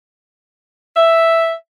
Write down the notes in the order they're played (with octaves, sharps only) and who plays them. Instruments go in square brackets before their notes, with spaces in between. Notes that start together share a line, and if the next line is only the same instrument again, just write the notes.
[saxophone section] E5